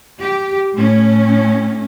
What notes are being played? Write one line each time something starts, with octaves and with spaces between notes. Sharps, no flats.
G4
A2 C#4